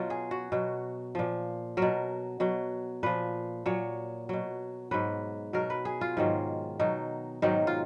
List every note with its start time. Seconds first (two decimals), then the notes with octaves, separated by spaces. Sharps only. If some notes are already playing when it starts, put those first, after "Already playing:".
Already playing: B2 F#3 F4
0.10 G#4
0.31 F#4
0.52 B2 F#3
1.15 A#2 F3
1.77 B2 F#3 A#4
2.40 B2 F#3
3.03 A#2 F3 B4
3.66 A#2 F#3 C#5
4.29 B2 F#3
4.91 G#2 F#3 B4
5.53 B2 F#3 A#4
5.70 B4
5.85 G#4
6.01 F4
6.17 G#2 D#3 F#3
6.80 B2 F#3 D#4
7.42 G#2 D#3 F#3 D#4
7.67 F4